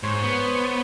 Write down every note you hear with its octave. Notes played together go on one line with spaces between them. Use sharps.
G#2 C5 C#5
B3